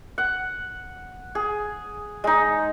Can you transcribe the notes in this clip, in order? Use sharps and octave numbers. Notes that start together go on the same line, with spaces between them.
F#5
G#4
G#3 D#4